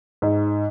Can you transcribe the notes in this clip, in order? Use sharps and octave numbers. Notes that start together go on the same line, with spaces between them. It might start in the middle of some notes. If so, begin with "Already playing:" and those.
G#2